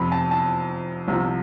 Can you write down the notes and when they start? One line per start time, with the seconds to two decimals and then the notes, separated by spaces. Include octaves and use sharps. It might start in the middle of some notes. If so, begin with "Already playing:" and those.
Already playing: F2 C3 F3 B5
0.12 A5
0.31 A5
1.08 C2 C3 F3